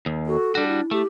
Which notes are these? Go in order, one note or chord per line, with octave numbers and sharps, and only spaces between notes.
D#2
F#4 A4
G3 D4 F#4
E4
A3 G4